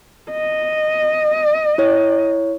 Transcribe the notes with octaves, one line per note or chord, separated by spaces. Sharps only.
D#5
E4 C#5